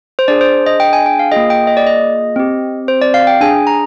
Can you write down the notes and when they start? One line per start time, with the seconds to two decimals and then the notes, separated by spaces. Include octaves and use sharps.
0.19 C5
0.28 D4 G#4 D5
0.41 C5
0.66 D#5
0.80 G5
0.93 G#5
1.06 G5
1.19 F5
1.32 A#3 F4 G#4 D#5
1.50 G5
1.67 D#5
1.77 D5
1.87 D#5
2.36 C4 G4
2.88 C5
3.02 D5
3.14 F5
3.27 G5
3.41 D4 G#4 G#5
3.67 A#5